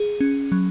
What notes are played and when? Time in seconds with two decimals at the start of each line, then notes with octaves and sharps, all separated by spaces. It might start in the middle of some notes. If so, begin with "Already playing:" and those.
Already playing: G#4
0.20 C#4
0.52 F#3